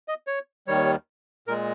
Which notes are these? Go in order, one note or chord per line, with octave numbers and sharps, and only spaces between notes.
D#5
C#5
D#2 D#3 G3 C#5
A#2 G#3 A#4